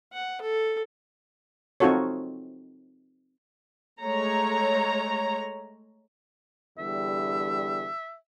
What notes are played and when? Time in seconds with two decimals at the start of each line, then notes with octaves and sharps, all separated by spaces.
0.13 F#5
0.42 A4
1.80 C4 D#4 F4 F#4 A4 C#5
4.02 G#3 A3 C#5 A#5
6.78 E2 D3 G3 E5